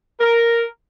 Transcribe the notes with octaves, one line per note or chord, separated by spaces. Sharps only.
A#4